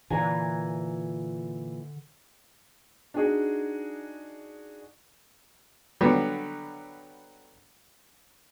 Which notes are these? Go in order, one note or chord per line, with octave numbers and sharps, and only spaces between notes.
A#2 D3 E3 G#5 A#5
D4 D#4 F#4 G#4 D#5
D3 F#3 G3 B3